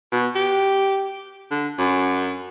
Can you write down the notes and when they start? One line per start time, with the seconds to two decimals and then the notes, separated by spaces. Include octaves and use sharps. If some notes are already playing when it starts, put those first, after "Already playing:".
0.12 B2
0.35 G4
1.51 D3
1.78 F#2